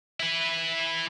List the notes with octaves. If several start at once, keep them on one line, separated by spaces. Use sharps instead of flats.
E4 B4